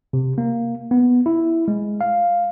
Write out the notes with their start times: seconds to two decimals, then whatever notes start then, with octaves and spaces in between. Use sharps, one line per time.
0.13 C3
0.38 A#3
0.91 B3
1.26 E4
1.68 G#3
2.01 F5